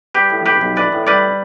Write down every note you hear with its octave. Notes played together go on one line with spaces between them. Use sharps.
G3 G4 B4
A2
B1 G4 B4
B1
E3 B4 D5
A2
G3 B4 D5